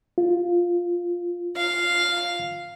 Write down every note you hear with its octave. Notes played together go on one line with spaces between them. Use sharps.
F4
F5